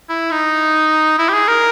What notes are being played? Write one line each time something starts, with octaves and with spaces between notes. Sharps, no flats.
E4
D#4
E4
G4
G#4
A#4